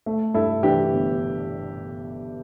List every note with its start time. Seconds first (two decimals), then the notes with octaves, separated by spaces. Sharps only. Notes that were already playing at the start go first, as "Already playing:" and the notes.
0.06 A3
0.34 G2 E4 A4
0.63 E3 D4 G4
0.92 G1